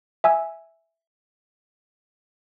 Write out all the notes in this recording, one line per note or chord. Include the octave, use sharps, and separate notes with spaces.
E5 G#5 E6